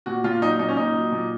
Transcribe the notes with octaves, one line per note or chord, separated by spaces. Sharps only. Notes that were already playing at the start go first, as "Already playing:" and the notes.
A#2 F#4
A#2 F4
F#3 D#4
A#2 D#4
C#4
A#2 D#4
F#3
A#2